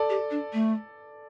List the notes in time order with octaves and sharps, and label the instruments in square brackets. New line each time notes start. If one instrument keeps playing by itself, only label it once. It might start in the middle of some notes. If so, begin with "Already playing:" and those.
Already playing: [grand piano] A4 D5
[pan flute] G4
D4
A3